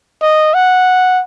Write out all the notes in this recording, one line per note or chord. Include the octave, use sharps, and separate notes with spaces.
D#5
F#5